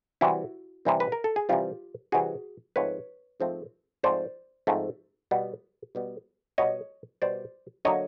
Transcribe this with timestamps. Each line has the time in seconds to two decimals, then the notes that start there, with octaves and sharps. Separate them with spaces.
0.21 C3 E3 G3 C4 E4 F#4
0.85 C3 E3 G3 C4
1.00 B4
1.12 A#4
1.24 A4
1.36 G#4
1.49 C3 E3 G3 C4 F4 G4
2.12 C3 E3 G3 C4 F#4 G#4
2.76 G#2 F3 A3 C4 B4 C#5
3.40 G#2 F3 A3 C4
4.03 G#2 F3 A3 C4 C5 D5
4.67 G#2 F3 A3 C4
5.31 B2 G3 B3
5.95 B2 G3 B3
6.58 B2 G3 B3 C#5 D#5
7.22 B2 G3 B3 C5 D5
7.85 D3 F#3 A#3 C#5 D#5